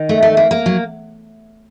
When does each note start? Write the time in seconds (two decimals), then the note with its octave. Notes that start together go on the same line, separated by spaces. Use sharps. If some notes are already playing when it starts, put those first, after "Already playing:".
Already playing: D#3 D#4
0.09 A3
0.22 A3
0.37 A#3
0.51 A#3
0.66 F#3